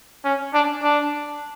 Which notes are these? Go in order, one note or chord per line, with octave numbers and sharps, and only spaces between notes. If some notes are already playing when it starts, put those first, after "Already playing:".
C#4
D4
D4